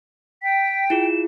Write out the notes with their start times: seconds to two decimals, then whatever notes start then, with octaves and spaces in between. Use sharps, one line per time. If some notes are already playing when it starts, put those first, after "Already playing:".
0.43 G5 B6
0.90 E4 F4 G#4 E7